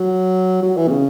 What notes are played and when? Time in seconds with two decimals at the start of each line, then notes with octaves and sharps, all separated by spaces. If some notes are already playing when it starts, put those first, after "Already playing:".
Already playing: F#3
0.62 F#3
0.77 E3
0.88 B2
0.91 C#3